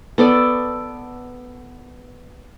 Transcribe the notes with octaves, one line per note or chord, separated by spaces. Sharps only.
B3 A4 D5